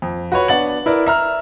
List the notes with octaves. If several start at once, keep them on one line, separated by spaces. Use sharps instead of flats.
F2
F#4 B4 C#5
B3 D4 F#5 A6 F#7
E4 A#4 B4 D5
E5 A#5 F6